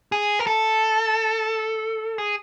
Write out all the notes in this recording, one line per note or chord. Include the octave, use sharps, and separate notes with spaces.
G#4
A#4
A4
G#4